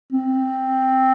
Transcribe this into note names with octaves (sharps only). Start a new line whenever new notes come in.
C4